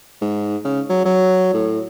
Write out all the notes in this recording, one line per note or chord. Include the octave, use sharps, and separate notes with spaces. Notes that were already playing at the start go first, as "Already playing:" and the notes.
G#2
C#3
F#3
F#3
A2